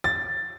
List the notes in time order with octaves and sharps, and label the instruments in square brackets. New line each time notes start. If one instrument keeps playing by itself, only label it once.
[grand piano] A6